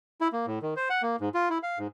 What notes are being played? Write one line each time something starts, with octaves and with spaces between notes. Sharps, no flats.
E4
A#3
A2
D#3
C5
F#5
A#3
G#2
F4
E4
F5
G#2